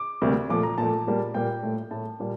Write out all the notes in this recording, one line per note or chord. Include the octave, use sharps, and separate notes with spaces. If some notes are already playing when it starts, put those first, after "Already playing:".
Already playing: D6
D2 C3 G3 A#3
A#2 F3 A3 D6
A#5
A#2 F3 A3 A5
A#2 G3 A#3
A#2 G3 A#3 G5
A2 A3
A2 A3 A5
A#2 G3 A#3